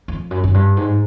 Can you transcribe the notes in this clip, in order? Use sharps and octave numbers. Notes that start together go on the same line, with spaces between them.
F2
F#2
F#2
G2
G#2